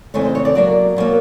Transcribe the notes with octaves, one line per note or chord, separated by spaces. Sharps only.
F2 C#3 E3 A3 C4 C#5
C5
C#5
D5
B2 F#3 A#3 D5
B2 F#3 A#3